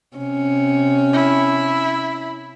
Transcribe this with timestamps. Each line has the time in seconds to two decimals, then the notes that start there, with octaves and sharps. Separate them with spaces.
0.17 C3 C#4
1.13 E4